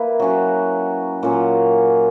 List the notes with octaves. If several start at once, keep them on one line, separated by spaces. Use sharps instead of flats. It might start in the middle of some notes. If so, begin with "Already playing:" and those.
Already playing: A#3 E4 B4
F#3 C#4 F#4
A#2 F#3 C#4